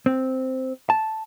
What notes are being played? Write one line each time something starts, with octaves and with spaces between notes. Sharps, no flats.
C4
A5